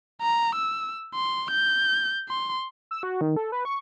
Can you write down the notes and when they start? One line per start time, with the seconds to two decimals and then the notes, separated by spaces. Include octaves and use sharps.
0.21 A#5
0.55 E6
1.14 C6
1.51 G6
2.29 C6
2.91 E6
3.03 F#4
3.21 D#3
3.36 A4
3.52 B4
3.65 C#6